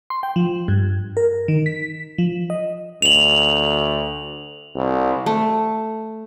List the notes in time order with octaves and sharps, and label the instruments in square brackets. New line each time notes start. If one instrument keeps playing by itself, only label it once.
[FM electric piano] C6
G5
F3
G2
A#4
D#3
B6
F3
D#5
[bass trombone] D2 [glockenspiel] F7 F#7
[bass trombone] C2
[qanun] A3